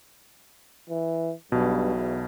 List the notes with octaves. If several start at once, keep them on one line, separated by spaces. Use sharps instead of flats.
E3
B1 G2 B2
E2